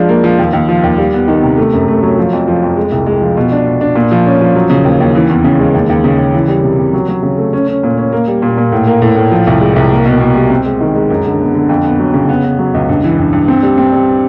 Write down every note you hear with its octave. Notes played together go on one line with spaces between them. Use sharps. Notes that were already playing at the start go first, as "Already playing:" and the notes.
Already playing: F3 G#3 D4
A#3
F3
D#2
D#2
F3
D#2
G3
B3
D#3
C3
A3
F#2
A3
F#3
F3
F2
F3
F2
G#3
C2
G#3
F3
B2
D4
B2
D4
A#2
F3
C#4
F3
F#3
C#3
D#2
D#2
E3
E2
C#3
G#3
D#2
D#2
C#3
C#3
E3
G3
C3
C3
F#3
F#3
C#3
A3
C#4
C#4
A#2
C#4
A#3
G3
A#2
A#2
A2
A#3
A2
A2
F3
C2
G#3
C2
A#3
B2
B2
G3
C4
G#3
D#3
G#3
F#2
D3
B3
D3
F2
B3
F#3
C#3
B3
B3
F#3
C#2
G2
E3
G2
G2
C4
G3
C4
G3